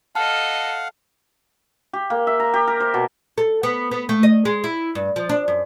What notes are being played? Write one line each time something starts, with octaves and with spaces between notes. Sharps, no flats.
A4 D#5 F5 F#5 A5 F6
G4
A#3
E5
A#5
G4
A#4
C5
B2
A4
B3
B3
A3
D#5
G#3
E4
G2
F3
D4
F#2